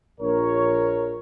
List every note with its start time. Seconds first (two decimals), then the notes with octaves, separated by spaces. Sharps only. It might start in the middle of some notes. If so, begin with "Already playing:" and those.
0.21 A#1 A#4 C#5